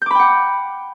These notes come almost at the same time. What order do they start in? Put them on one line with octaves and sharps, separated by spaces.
G6 D6 B5 G5 F#5